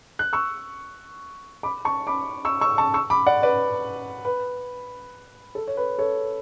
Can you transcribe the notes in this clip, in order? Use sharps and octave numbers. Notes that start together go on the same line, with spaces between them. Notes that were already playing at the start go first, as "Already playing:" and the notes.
F#6
C#6 E6
B5 D6
A5 C#6
B5 D6
C#6 E6
C#6 E6
A5 C#6
C#6 E6
B5 D6
D5 F#5
B4 D5
B4
A4
C#5
B4
A4 C#5